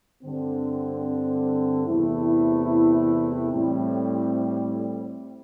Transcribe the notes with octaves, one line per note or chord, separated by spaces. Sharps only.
G2 D3 C4
E2 C3 A3 E4
A2 G3 C4